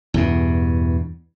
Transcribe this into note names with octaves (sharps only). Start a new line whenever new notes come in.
E2 G2 B2